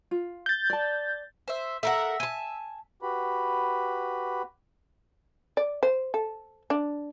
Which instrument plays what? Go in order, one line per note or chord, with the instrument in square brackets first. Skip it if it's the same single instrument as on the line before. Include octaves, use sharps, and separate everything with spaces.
[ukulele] F4
[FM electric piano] G6 A6
[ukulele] D5 A5
[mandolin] C5 E5
[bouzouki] A4 A#4 F#5 [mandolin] E5
[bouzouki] G#5 A5
[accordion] F#4 G4 B4 B5
[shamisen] D5
C5
A4
D4